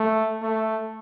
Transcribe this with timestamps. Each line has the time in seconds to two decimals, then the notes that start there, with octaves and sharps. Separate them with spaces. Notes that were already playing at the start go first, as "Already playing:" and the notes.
Already playing: A3
0.43 A3